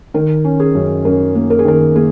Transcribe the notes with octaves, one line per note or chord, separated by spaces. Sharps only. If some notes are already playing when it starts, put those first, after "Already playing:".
D#3 A#4
C#4
G#4
F#2
F#2 A#4
A#3
A#4
G#4
D#3 A#4
A#3 G#4